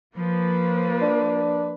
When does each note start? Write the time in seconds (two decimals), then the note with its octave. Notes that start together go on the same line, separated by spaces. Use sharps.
0.17 F3 A#3 B4
1.02 D4